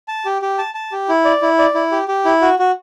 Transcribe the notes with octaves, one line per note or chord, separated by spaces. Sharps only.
A5
G4
G4
A5
A5
G4
E4
D5
E4
D5
E4
G4
G4
E4
F#4
F#4